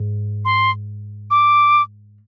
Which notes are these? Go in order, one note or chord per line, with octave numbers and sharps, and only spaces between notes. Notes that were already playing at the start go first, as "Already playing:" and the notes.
Already playing: G#2
C6
D6